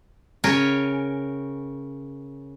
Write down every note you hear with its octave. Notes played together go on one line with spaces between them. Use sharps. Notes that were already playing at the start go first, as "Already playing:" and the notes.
C#3 A#4 C#5 G5 G#5